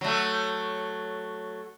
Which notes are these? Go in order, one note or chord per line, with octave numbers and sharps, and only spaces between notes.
F#3 A3